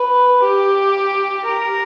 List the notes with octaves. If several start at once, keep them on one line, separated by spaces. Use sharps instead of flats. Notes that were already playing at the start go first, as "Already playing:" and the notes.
Already playing: B4
G4
A#4